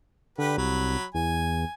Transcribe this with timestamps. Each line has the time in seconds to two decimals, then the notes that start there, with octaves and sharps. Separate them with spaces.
0.38 D3 G4 B4
0.58 C2 F#3 B5
1.14 E2 G#5